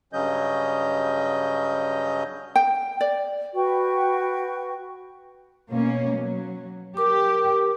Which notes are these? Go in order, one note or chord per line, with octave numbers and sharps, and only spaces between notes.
G2 C#3 F#3 C#4 D#5 G6
G5
D5
F#4 B4 G5 C#6
B2 A#3 C#4
F#3
G4 A#4 D6